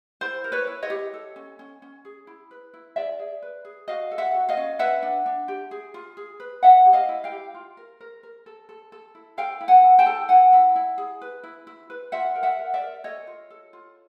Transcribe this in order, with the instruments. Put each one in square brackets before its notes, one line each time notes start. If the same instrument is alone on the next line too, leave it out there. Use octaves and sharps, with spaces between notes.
[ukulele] E4 C5
A#4
B4 C#5
E4
C#5 D#5
G4
A4
C#4
C#4
C#4
G#4
E4
B4
E4
G#4 D5 E5
G#4
B4
G#4
F#4 D#5 F5
A4
E5 F#5
F#4
D#5 F5
C#4
B4 E5 F#5
D4
D4
G4
G#4
F4
G#4
B4
E4 E5 F#5
G4
D#5 F5
E4
F5 G5
G4
F4
A#4
A#4
A#4
A4
A4
A4
E4
A4 F5 G5
E4
F#5 G#5
E4
G5 A5
A4
E4 F#5 G#5
E4
E4
G#4
B4
E4
E4
B4
F4 E5 F#5
A#4
E5 F#5
A#4
D5 E5
A#4
A4 C#5 D#5
F4
A4
F4